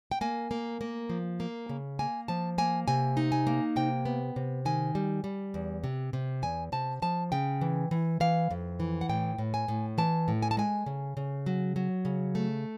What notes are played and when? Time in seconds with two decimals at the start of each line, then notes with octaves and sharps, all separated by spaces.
0.11 G5
0.21 A#3 G#5
0.51 A#3
0.81 A#3
1.09 F3
1.40 A#3
1.69 C#3
1.99 A#3 G#5
2.28 F3 A5
2.58 A#3 G#5
2.88 C3 G#5
3.17 D#4
3.32 G#5
3.47 A#3
3.76 C3 G5
4.05 B3
4.36 C3
4.65 D#3 G#5
4.95 G3
5.24 G3
5.54 E2
5.84 C3
6.13 C3
6.43 E2 G#5
6.72 C3 A5
7.02 F3 A5
7.32 C#3 G5
7.61 E3
7.91 E3
8.20 E3 F5
8.51 F2
8.80 E3
9.01 F#5
9.09 A2 G5
9.38 A2
9.54 G#5
9.68 A2
9.98 E3 A5
10.28 A2
10.42 G#5
10.51 A5
10.57 G#3 G#5
10.86 C#3
11.17 C#3
11.46 F#3
11.76 F#3
12.05 C#3
12.35 A3